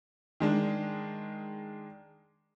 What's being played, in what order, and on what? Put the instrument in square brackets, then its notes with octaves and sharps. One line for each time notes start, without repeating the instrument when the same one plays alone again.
[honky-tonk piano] D#3 G#3 D4